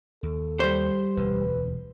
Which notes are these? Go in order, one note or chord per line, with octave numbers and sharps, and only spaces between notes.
D#2 A4
G3 C5
E1 D2 D3 B4